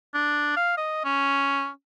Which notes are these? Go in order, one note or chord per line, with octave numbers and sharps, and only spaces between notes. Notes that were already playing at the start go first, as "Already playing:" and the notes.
D4
F5
D#5
C#4